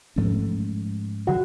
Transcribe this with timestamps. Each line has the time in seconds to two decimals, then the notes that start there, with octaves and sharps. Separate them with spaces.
0.16 G#2 F3 A3 C#4
1.27 D3 F#3 F#4 F#5